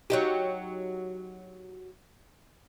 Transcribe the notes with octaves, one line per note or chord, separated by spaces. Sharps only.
F#3 D#4 G4